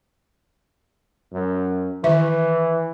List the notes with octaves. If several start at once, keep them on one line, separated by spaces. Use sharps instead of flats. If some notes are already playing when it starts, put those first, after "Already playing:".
F#2
D#3 E3 E5